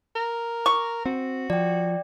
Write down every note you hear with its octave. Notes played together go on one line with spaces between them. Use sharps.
A#4
C#6
C4 F#4
F3 D5 G5